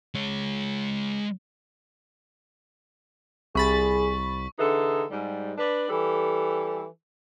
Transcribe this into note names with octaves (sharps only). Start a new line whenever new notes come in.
G#3 C#5
C2 G#4 B5 C#6 A6
D3 E3 D#4 G#4 A4
G#2 G3
D4 B4
E3 G3 G4 A4